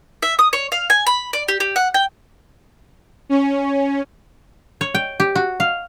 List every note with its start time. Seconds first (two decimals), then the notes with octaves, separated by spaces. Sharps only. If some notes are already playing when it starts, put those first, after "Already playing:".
0.22 E5
0.39 D#6
0.53 C#5
0.72 F5
0.90 G#5
1.07 B5
1.33 D5
1.48 G4
1.60 G4
1.76 F#5
1.94 G5
3.29 C#4
4.81 C#5
4.95 G5
5.20 G4
5.35 F#4
5.60 F5